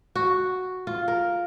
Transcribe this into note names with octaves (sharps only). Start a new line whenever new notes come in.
F#4
F4
A#4